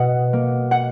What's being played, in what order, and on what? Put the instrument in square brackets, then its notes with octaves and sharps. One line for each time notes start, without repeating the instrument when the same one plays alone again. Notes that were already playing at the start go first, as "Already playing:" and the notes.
Already playing: [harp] B2 F#5
A#3
F#5